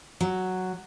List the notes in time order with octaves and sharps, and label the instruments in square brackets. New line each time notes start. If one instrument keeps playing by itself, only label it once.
[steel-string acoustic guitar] F#3